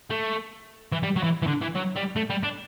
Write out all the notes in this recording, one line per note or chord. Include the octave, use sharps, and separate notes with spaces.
A3
E3
G3
F#3
E3
E3
D3
E3
F#3
G3
A3
G3
D4